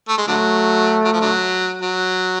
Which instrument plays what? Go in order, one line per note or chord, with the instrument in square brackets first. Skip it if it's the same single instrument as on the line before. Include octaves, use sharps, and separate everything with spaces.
[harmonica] A3
G#3
[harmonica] D3 F#3 [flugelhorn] A3
[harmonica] F#3
F3
D3 F#3
F#3